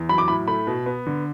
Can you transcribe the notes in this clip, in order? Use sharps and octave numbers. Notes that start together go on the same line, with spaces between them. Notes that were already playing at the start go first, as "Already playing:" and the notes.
Already playing: E2
F#3 B5
D6
A2 B5
A3 B5
B2
B3
D3